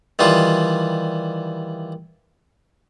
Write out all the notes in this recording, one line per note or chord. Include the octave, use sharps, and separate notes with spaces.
D#3 E3 G3 F4